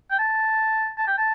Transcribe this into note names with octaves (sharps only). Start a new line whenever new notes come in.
G5
A5
A5
G5
A5